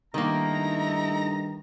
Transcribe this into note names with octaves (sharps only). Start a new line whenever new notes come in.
G2 D#3 A3 A#3 D#4 E4 A#5